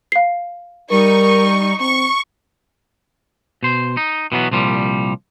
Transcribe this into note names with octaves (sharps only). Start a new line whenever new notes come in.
F5 C7
G3 D#4 A#4 C#6
C4 C#6
B2 C5
D#4
B2 E3 F#3 B3
C2 A#2 F3 G3